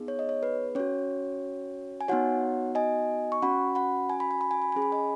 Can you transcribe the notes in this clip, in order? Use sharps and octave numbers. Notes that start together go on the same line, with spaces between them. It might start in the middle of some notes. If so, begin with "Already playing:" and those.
Already playing: B3 D#4 G#4
C#5
D#5
C#5
B4
C#4 F#4 C#5
G#5
B3 D#4 F#4 C#5 F#5
D#5 G#5
C#6
C#4 F#4 F#5 B5
F#5 B5
G#5
B5
G#5
B5
G#5
B5
C#4 G#4 G#5
B5
D#5 G#5